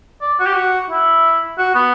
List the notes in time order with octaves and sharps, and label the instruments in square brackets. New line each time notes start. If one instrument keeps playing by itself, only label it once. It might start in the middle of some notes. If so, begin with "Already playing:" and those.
[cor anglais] D5
F#4
G4
F#4
E4
F#4
B3